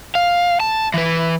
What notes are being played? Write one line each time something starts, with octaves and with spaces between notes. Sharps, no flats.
F5
A5
E3 B4